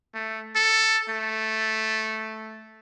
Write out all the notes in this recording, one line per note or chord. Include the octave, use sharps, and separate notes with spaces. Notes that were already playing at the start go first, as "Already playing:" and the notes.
A3
A4
A3